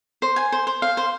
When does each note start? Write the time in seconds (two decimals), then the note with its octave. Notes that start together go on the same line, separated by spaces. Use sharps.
0.22 C5
0.36 G#5
0.52 C5
0.67 C5
0.82 F5
0.97 C5